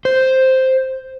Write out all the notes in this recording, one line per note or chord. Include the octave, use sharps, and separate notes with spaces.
C5